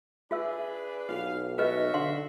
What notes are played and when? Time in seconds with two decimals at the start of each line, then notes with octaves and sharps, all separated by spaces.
0.31 D4 F4 G#4 B4 E5 E6
1.09 B1 F4 F5
1.58 F4 F#4 B4 D#5 E5
1.94 D3 F5 F#5 C6